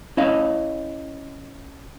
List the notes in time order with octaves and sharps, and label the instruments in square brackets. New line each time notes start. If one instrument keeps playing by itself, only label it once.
[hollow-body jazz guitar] C#4 E4 D#5 F5